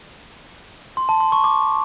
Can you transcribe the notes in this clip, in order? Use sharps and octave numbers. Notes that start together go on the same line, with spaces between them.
C6
A5
C6
C#6
D6